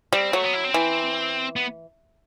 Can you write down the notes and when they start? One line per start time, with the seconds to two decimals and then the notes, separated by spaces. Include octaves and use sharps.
0.13 G3 C4
0.33 F#3 A3
0.44 B3
0.53 E4
0.64 C4
0.74 E3
1.56 B3